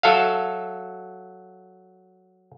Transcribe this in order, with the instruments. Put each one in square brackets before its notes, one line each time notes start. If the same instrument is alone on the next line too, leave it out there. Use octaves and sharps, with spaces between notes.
[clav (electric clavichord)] F#3 A4 E5 F5